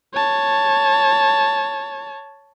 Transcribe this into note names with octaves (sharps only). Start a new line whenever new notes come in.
C#5 A5